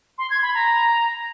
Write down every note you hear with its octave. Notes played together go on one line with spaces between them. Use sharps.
C6
G#6
B5
A#5